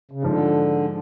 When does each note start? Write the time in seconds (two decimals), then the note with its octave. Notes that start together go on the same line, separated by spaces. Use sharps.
0.11 C#3
0.23 G#2 D3 F3 G#3